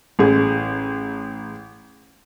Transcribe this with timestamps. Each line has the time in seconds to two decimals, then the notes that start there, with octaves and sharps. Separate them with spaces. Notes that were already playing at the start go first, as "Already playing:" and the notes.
0.19 A1 G#4